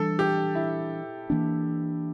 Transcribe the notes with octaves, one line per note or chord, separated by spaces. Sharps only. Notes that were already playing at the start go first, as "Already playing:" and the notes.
Already playing: E3 G3 D4 A4
G4
E4
E3 A#3 D4